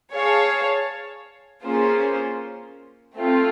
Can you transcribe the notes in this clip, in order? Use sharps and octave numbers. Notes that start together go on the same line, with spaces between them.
G#4 C#5 F5 A5
A#3 C#4 F4 G#4 C5
A3 C4 F4